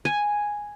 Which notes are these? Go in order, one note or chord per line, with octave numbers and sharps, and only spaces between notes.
G#5